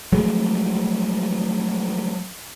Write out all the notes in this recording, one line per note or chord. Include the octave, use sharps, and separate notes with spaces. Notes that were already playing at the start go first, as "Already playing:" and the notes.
F3 F#3 G#3 A3